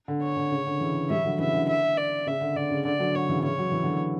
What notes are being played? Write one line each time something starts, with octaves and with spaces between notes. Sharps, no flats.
D3
C#5
D3
C#3
D3
C#3 E3
E3 G3 E5
D3 F#3
C#3 E3 E5
D3
E5
D5
C#3 E5
D3
D3 D5
C#3
D3 D5
D3 F#3
D3 C#5
C#3 E3
D3
C#3 E3 C#5
F#3
E3
D3 F#3